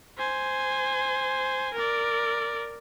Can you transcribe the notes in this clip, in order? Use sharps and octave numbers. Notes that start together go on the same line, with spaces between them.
C5 G#5
A#4 D5